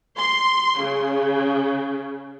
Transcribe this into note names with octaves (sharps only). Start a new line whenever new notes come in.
C6
C#3